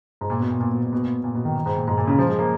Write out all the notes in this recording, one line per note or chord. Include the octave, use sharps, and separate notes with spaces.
G#2
A#2
B2
A#2
A#2
B2
A#2
B2
A#2
A#2
B2
D#3
D#3
G#2
A#2
G#2
A#2
C#3
F3
G#3
A#3